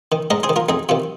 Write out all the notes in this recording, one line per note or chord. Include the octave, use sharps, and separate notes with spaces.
D#3
G#2 A#4 D#5
G#4 C5
D#3
F4 A#4
F2 D#4 G#4
C3 D#3 F4